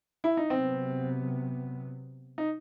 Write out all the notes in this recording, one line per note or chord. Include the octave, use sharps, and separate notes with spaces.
E4
D#4
C3 F#3 B3 C4
D#4